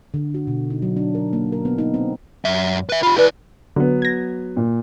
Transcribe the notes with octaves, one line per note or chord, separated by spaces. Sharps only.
D3
F#4
B2
D#4
F#3
D4
A#4
A#3
A#4
B3
D#4
C4
F#2 E5
B4 E5
F4 G4 B5
E4 B4 D5
D3 F#3 B3
G#6 A#6
A#2